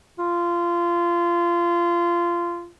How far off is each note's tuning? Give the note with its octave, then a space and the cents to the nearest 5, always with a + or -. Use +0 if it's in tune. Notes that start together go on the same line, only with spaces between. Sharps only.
F4 -20